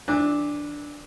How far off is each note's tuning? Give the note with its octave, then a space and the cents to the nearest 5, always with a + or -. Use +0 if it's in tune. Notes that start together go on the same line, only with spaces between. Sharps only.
E3 -25 D4 +0